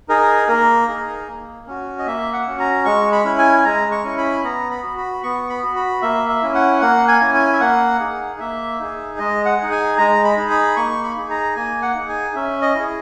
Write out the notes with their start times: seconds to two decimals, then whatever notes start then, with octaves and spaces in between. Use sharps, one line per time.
0.09 D#4 G#4 A#4
0.48 A#3 A#4
0.88 D#4 G#4
1.28 A#3
1.67 C#4 F#4
1.99 D#5
2.06 A#3 E5
2.33 F#5
2.47 C#4 F#4
2.59 A#5
2.85 G#3 C#6
3.12 B5
3.25 C#4 E4
3.39 G#5
3.58 G#5
3.65 G#3 A#5
3.91 C#6
4.04 C#4 E4
4.18 B5
4.43 B3 A#5
4.71 B5
4.83 F#4
4.97 B5
5.23 B3 C#6
5.50 B5
5.63 F#4
5.76 B5
6.02 A#3 E5
6.29 E5
6.42 C#4 E4
6.55 F#5
6.81 A#3 F#5
7.08 G#5
7.21 C#4 E4
7.34 G#5
7.53 E5
7.60 A#3 F#5
8.00 D#4 G#4
8.40 A#3 E5
8.80 D#4 G#4
9.18 G#3 D#5
9.45 F#5
9.58 D#4 G#4
9.71 G#5
9.98 G#3 A#5
10.24 B5
10.37 D#4 G#4
10.51 B5
10.76 A#3 C#6
11.03 B5
11.16 D#4 G#4
11.30 A#5
11.56 A#3 G#5
11.82 F#5
11.95 D#4 G#4
12.09 G#5
12.35 C#4 E5
12.62 D#5
12.75 E4 G#4